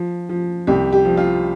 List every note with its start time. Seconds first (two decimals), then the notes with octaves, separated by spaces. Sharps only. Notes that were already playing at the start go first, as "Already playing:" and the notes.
Already playing: F3
0.29 F3
0.67 C2 G4
0.93 G4
1.05 F3
1.17 F4